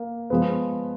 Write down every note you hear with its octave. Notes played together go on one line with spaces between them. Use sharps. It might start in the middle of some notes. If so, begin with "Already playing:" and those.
Already playing: A#3
F3 G#3 B3